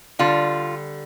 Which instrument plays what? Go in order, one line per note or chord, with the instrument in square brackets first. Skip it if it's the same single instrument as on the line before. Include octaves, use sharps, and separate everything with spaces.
[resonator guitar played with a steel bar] D3 G3 F4